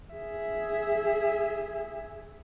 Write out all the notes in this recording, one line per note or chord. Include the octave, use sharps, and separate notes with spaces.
G#4 E5